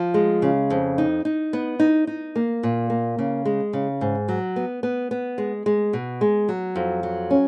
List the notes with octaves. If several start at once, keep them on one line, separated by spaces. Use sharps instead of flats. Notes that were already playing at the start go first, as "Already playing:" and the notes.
Already playing: F3
G#3
C#3
F2
D#4
D#4
B3
D#4
D#4
A#3
A#2
A#3
C#3
G#3
C#3
G#2
F#3
B3
B3
B3
G#3
G#3
B2
G#3
F#3
F2
F#3
C#4